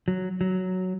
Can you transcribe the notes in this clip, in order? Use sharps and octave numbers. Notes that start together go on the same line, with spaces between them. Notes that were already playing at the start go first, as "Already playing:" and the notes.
F#3
F#3